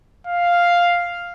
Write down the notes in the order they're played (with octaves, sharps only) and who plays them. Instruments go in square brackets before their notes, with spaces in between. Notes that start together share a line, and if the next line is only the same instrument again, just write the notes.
[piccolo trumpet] F5